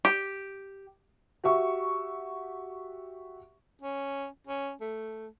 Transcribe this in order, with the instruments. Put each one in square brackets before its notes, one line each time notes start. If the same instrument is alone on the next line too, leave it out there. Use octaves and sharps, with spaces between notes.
[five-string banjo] G4
[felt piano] F#4 G4 E5 C#6
[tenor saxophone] C#4
C#4
A3